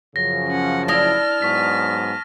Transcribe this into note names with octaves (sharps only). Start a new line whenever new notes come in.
F#2 C#3 F3 A#6
C#4 F#5
D4 E4 A5 D#6 F6 A#6 G7
G#2 F#3 B3 C#6 B6